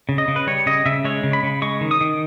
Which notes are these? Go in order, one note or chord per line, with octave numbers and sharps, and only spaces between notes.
C#3
D#5
C#3
B4
G3 C#5
C#3 D#5
C#3 E5
G#3 C#5
C#3
B5
C#3
G#3 C#6
D#3
D#6
D#3